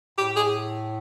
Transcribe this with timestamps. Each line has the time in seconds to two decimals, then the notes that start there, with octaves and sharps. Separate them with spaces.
0.18 A2 G4
0.36 G#4